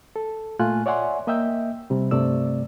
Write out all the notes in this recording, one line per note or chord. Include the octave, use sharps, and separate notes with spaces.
A4
A#2 A3 F4 G#5 F#6
C#5 D5 E5 F#5 G#5 C6
A#3 D#5 E5 G5 E6 G6
C3 G3
G2 C3 A3 D5 E6